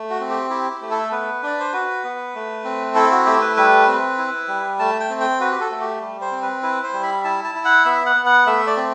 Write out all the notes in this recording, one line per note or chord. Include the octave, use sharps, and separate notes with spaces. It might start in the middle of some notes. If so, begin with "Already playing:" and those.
Already playing: A3
F#4
C4
G4
E4 G4
G4
A3
A4
B3 B4
D4 D5
C5
F#4 B4
B3
A3
C4
E4 A4
F#4
A3 G4
B4
G3 B4
C4
E4
G3
A3 A5
G5
C4
G5
F#4 B4
G4
A4
A3
G4
G3
C5
C4
B4
E4 B4
C5
G3
B5
E4 A5
A5
E4
F#5
B3 E5
F#5
B3
F#5
A3 E5
D5
C4